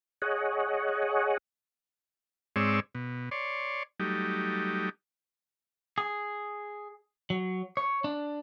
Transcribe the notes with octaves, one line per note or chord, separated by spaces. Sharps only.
G#4 C#5 D#5 F#5
G#2 G#3 C4 C#5 D5 E6
B2
C#5 D5 C6
F#3 G3 A3 D#4 G4
G#4
F#3
C#5
D4